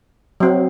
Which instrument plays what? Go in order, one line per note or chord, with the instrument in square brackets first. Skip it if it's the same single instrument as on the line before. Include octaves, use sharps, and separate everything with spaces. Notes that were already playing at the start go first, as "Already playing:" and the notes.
[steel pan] F#3 C4